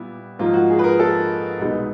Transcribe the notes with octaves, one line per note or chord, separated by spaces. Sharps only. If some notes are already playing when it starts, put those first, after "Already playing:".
Already playing: A#2 G3 B3 E4
G#2 F3 A#3 F4
F#4
G#4
B4
A#4
A4
C2 B2 G#3 B3 D#4